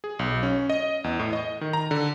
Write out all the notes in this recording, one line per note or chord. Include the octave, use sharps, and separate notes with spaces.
G#4
B1
C#4
D#5
E2
A2
D#5
D#3
A#5
D3